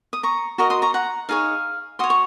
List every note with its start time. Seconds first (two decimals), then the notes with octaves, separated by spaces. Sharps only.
0.13 D#6
0.23 A#5 C#6
0.58 F#4 A#4 D#5 A#5 C#6
0.70 C6 D#6
0.82 A#5 C#6
0.94 F#5 A#5
1.29 D#4 G#4 C#5 F5
1.99 F#4 C#5 C6 D#6
2.10 C#6